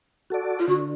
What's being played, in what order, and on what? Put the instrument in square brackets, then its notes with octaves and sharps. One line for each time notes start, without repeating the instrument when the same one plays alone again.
[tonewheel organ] F#4 A4 D5
[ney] F4
[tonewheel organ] D3 [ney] F#4